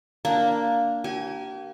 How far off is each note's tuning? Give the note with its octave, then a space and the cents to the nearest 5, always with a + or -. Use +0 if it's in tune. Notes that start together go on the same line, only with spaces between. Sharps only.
A#3 +0 D4 +0
G4 -40 G#5 +0